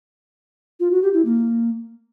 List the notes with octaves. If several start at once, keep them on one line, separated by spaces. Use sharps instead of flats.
F4
F#4
G4
E4
A#3